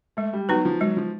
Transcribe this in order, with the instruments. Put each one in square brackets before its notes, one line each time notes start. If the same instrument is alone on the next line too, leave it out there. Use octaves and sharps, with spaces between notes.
[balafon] G#3 [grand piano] A3
[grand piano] G3
[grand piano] F#3 [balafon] B3 D#4 F#4 B4
[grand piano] F3
[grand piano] F#3 [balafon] G#3
[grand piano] F3